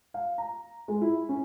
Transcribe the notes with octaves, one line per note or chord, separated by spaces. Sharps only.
F5
A#5
G#3
E4
C#4